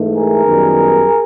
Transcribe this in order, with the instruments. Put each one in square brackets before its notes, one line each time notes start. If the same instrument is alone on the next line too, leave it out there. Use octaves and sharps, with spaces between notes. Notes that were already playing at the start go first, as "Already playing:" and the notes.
Already playing: [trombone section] G#2 E3 A3
G#4 A#4
F#2 D#3 G3 B3